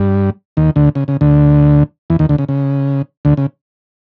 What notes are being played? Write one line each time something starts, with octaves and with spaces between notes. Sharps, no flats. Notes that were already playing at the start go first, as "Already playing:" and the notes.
Already playing: G2 G3
D#2 D#3
D2 D3
C#3
C#3
D2 D3
E2 E3
D#2 D#3
D2 D3
C#3
C#3
D2 D3
C#3